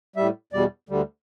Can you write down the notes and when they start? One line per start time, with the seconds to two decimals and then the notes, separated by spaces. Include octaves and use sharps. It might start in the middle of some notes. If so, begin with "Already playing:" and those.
0.16 A2 G3 E5
0.53 E2 B2 G3 D5
0.89 D2 D3 G3